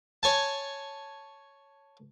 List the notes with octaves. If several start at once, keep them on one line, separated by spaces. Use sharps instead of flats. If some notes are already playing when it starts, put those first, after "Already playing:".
C#5 G#5 A5